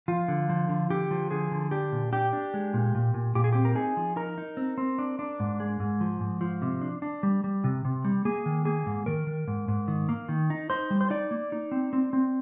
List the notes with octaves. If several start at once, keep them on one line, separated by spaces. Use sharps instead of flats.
F3 F4
D3
F3
D3
D3 G4
F3
D3 G#4
D3
D4 G4
A#2
D4 G4
D4
G#3
A#2
A#2
A#2
A#2 G4
G#4
C4 G4
A#4
D#4 G#4
F3
D#4 A#4
D#4
C4
C4
D4
D4
G#2
G#3
G#2
F3
G#2
F3
C3
D4
D4
G3
G3
C3
C3
G3
A#3 G#4
D#3
A#3 G#4
G#2
D#3 A#4
D#3
G#2
G#2
D#3
A#3
D#3
D#4
D#4 C5
G3
C5
D#4 D5
A#3
D#4
C4
C4
C4